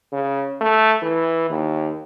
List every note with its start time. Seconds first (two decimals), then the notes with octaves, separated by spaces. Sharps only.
0.12 C#3
0.61 A3
1.03 E3
1.50 D#2